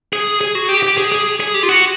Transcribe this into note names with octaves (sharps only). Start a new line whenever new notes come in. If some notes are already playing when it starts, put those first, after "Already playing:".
G#4
G#4
F#4
G4
G4
G#4
G#4
G#4
G4
F4
F#4